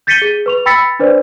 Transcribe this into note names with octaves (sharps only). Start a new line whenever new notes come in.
G6 A6 B6 C#7 D#7 G7
G#4
B4 C#6 F7
G5 B5 E6 A6 B6 C#7
D4 B4 C5 D5